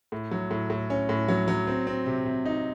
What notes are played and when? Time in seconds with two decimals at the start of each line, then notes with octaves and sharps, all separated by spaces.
0.12 A2
0.31 F#3
0.51 A2
0.70 A2
0.90 C#4
1.09 A2
1.28 F#3
1.48 F#3
1.67 C4
1.87 C4
2.06 C3
2.26 C3
2.46 D#4